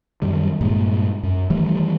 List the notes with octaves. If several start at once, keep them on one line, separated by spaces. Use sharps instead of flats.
F#2 D#3 G3
G2 A#2 G#3
F#2
D#3 E3 G3 A3